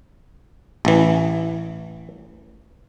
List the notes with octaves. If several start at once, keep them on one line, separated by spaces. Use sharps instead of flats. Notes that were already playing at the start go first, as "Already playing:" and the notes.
A1 E3